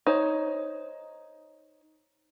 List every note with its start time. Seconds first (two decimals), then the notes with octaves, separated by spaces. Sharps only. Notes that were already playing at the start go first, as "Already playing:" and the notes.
0.07 D#4 C5 C#5